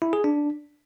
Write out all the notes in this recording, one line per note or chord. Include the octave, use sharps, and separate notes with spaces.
E4
G#4
D4